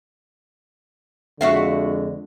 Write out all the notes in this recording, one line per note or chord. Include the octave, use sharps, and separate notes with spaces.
F2 D3 G#3 F#4 E5 F5